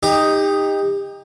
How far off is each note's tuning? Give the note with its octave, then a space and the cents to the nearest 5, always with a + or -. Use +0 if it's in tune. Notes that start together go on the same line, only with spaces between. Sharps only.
D#4 +0 G4 +25